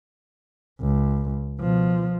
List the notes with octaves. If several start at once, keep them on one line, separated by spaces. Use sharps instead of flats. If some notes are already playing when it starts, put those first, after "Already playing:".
C#2
B2 F3